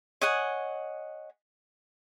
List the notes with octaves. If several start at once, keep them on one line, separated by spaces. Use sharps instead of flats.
C#5 D#5 F#5 G#5